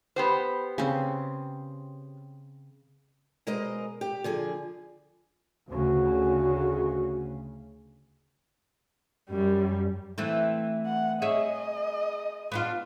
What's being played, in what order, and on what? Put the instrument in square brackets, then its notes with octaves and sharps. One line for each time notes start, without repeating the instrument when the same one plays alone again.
[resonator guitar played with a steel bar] B3 G4 C5
[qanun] C#3 C4
[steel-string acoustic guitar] B2 G#3 A#4 C5 D#5
G4
D3 F3 G#4
[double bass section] D2 C#3 [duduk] F#4
[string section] F#2 [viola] G3
[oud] E3 A3 C4
[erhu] F#5
[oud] G#4 C#5 E5 [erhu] D#5
[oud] B3 D4 F4